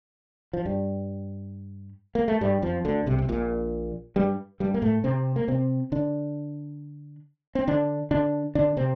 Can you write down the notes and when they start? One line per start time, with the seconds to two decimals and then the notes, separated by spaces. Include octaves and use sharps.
0.53 F3
0.65 G2 G3
2.15 A#3
2.28 A3
2.41 G2 G3
2.62 F2 F3
2.85 D2 D3
3.06 C2 C3
3.18 C3
3.29 A#1 A#2
4.16 G2 G3
4.60 G2 G3
4.74 A#3
4.82 A2 A3
5.04 C3 C4
5.36 A#3
5.48 C3 C4
5.92 D3 D4
7.55 C4
7.67 D3 D4
8.11 D3 D4
8.55 D3 D4
8.77 C3 C4